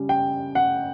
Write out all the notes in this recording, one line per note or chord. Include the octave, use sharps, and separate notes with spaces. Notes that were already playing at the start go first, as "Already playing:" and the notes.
Already playing: C#3 G3
G5
F#5